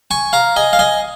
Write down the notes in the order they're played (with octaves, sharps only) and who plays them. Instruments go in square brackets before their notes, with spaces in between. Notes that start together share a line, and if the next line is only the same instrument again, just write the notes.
[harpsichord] G#5 C#6
F5 A#5
D#5 G#5
F5
D#5 G#5